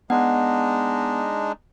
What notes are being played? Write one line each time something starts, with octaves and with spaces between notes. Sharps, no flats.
G#3 B3 D4 D#4 F#5